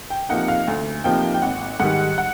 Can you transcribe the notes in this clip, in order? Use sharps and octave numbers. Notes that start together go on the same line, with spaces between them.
G5
C3 F3 A#3 D#4 F#5
F5
D2
C3 F3 A#3 D#4 G5
G5
G#1 F#5
G#2 D#3 G3 F#5
F#5